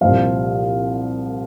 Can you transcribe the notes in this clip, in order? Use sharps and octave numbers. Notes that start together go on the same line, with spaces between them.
C2 A#2 F3 F5